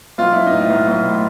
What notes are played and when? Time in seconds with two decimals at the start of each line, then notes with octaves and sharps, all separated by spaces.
0.18 B1 F4
0.32 B1 E4
0.47 D#4
0.53 A2
0.60 E4
0.70 B1
0.87 B1
1.05 A2